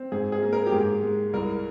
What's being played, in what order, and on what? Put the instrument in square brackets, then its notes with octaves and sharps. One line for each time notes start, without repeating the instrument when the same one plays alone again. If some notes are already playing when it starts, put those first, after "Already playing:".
Already playing: [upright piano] C4
G#2 G#4
G#4
A#3
A#4
G4
G#2 G#4
G#3
C2 A#4